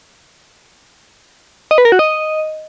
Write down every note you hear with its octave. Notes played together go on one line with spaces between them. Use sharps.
D#5
B4
A#4
F#4
D#5